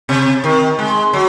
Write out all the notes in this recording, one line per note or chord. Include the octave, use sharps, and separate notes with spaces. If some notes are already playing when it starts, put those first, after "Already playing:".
C3
D#3
G#3
F#3